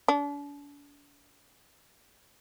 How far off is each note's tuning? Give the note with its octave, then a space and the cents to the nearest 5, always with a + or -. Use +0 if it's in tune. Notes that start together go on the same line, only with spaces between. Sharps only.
D4 -40